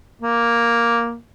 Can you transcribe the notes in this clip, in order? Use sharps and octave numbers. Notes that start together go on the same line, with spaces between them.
A#3